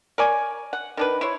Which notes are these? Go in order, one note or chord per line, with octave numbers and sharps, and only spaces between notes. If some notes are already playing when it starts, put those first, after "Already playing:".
A#4 C#5 D5 G#5
F#5
D#3 D4 B4
E4 C5 C#5